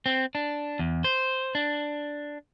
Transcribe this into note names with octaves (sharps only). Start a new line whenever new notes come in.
C4
D4
E2
C5
D4